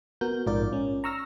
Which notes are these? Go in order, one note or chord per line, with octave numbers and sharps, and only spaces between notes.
B3 F#4 A#4 G6
A#1 G#2 F4 A#4 D5
C#4
A#5 C#6 E6 F6 A#6